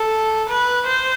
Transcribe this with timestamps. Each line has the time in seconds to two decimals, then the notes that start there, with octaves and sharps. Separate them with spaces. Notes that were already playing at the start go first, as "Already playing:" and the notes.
Already playing: A4
0.49 B4
0.86 C5